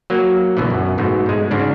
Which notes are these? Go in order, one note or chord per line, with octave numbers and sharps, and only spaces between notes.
F#3 A#3
B1 B2 D3 E3
F#2
G#2 B2 A3
G#2 G#3
G#2 C#3 D4